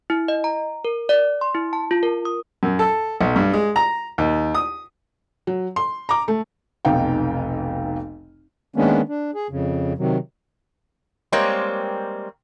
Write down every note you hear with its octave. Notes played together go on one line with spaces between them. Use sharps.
E4
D#5
A#5
A#4
D5
C6
E4
A5
F4
A#4
D#6
F#2
A4
B1
G2
G#3
A#5
D#2
D#6
F#3
C6
A#5 D6
A3
F1 B1 D#4 F5 G5
D#3 G#3 A#3 B3 C#4 D4
D4
G#4
F2 C#3
C3 D#3 F#3
G3 G#3 A#3 C4 A#4 C#5